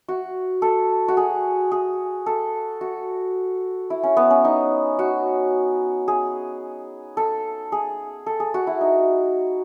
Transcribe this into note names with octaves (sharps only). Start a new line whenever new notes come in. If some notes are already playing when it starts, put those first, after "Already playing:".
F#4
A4
F#4
G#4
G#4
A4
F#4
E4
C#4
B3
C#4
D#4
F#4
G#4
A4
G#4
A4
G#4
F#4
E4
D#4